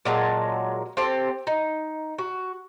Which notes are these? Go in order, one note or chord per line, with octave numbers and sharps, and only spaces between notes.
A#2 F#3 G#3 A5
C4 G4 A4 C5
D#4
F#4